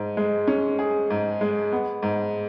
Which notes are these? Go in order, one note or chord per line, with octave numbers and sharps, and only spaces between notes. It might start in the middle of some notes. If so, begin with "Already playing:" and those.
Already playing: G#2
G#3
C#4
G#4
G#2
G#3
B3
G#2